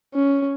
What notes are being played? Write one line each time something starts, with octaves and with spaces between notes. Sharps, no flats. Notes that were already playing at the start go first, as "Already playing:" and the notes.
C#4